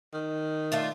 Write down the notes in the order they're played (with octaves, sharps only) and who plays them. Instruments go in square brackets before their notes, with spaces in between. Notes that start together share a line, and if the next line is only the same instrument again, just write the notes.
[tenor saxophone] D#3
[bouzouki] A3 D4 F4